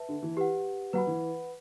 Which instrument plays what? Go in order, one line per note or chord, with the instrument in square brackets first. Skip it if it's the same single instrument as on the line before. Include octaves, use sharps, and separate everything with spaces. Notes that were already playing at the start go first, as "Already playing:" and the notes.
Already playing: [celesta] B4 E5 A5
[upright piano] D3
E3
[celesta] G4 B4 F#5
[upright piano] F#3 [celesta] B4 F#5 B5
[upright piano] E3